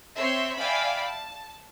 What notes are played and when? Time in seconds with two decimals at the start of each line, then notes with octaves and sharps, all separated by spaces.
0.16 C4 C#5 E5 C6
0.57 D5 E5 F5 G5 G#5 B5
1.06 A5